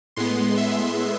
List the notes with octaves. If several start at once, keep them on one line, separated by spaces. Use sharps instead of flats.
A2 G#3 B3 C6
E5